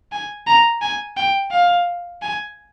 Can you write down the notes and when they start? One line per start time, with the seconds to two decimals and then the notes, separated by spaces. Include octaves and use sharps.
0.12 G#5
0.46 A#5
0.81 G#5
1.17 G5
1.51 F5
2.22 G#5